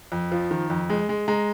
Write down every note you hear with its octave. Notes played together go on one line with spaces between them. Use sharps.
F2
F3
D#3
F2
G#3
G#3
G#3 A#5